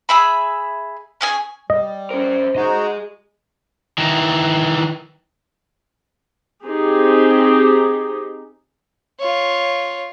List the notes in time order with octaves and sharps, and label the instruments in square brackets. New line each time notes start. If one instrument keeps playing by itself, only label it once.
[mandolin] G#4 E5 B5
C#4 G#4 G#5
[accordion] G3 [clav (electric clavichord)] D#5
[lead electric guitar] C#4 A#4 [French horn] C5
[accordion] D#4 F#4 [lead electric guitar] G#4 D#5
[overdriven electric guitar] D#3 E3
[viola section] C4 D#4 G4 G#4
[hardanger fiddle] F4 C#5